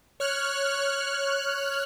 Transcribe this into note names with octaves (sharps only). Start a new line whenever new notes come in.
C#5 F6 F#6